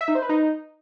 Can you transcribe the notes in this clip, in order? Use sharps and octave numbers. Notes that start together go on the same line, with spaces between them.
E5
D#4
C5
B4
D#4